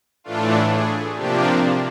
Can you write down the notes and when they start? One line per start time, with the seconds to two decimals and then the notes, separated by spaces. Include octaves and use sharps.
0.24 A2 E3 A3 D4 F4
0.70 G#4
1.16 C3 F3 A#3 D4 G4